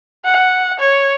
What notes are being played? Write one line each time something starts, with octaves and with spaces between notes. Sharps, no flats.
F#5
C#5